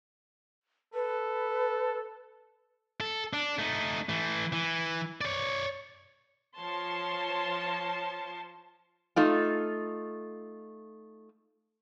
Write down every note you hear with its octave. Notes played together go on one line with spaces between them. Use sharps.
A4 B4
A4
D4
A3 D#4
E3 A3
E3
C#5 D5
F3 C#5 A5 C6
A3 D#4 F4